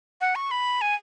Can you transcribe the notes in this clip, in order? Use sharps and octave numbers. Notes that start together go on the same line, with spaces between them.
F#5
C#6
B5
G#5